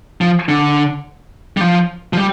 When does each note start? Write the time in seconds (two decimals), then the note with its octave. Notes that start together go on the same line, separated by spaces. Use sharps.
0.21 F3
0.49 D3
1.57 G3
1.61 F3
2.13 F3
2.17 G3